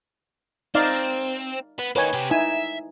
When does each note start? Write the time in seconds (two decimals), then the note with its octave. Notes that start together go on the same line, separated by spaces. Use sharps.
0.75 C4 D#4 D5 F5
1.79 B3
1.96 A#3 D#4 B4 C#5 G#5
2.14 C3 G4
2.31 D#4 E4 E5 G#5